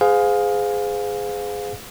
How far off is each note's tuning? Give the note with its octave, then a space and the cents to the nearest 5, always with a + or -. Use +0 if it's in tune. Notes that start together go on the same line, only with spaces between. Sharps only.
G#4 +0 C5 -40 F5 +20